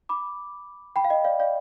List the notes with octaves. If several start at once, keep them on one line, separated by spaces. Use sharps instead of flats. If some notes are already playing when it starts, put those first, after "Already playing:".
B5 D6
G5 B5
F5
D#5 G5
D5 F5
D5 F5